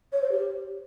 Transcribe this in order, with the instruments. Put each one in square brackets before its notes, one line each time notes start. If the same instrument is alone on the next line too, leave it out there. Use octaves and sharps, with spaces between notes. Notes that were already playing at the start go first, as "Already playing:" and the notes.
[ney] C#5
C5
G4